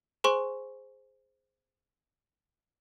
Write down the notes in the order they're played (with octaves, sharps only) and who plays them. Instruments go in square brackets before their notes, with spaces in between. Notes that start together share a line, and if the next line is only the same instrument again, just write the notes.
[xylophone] G#4 C5 G#5 C6 C#6